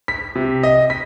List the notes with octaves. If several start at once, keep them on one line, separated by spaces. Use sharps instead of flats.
B6
C3
D#5
B6